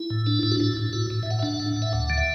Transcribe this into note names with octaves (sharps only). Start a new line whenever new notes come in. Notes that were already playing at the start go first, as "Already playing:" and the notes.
Already playing: E4
A2
D4
A2 E4
F#4
A2 E4
A2
A2 F#4
A2
E5
A2 F#5
E5
D4 F#5
A2
A2
E5
D2 F#5
D3
E5